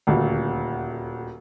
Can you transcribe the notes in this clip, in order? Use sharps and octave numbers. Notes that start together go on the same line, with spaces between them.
D#1 D2